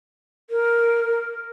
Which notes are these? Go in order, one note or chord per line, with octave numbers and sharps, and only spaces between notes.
A#4